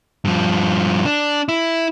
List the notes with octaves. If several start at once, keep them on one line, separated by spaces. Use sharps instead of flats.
G2 F3
D4
E4